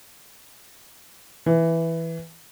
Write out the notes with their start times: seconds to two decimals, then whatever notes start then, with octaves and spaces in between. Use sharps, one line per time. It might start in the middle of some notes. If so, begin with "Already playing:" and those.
1.46 E3